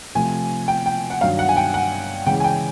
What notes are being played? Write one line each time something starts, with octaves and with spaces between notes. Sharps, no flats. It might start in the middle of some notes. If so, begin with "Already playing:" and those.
C3 F3 A3 G#5
G5
G5
F#5
G2 D#3 F#3 F5
F#5
G#5
G5
F#5
C#3 E3 G#3 G5
G#5
G5